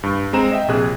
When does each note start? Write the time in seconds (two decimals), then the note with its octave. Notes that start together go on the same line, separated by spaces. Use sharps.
0.03 G2
0.33 G#3 C4 A#5 E7
0.52 D#5 E5 G5
0.68 A#1 C3 G#4 F#6